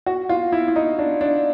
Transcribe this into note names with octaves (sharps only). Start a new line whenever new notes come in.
F#4
F4
E4
E4
D#4
D4
D4